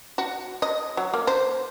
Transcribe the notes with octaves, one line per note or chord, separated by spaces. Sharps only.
F#4
D#5
F#3
A#3
C5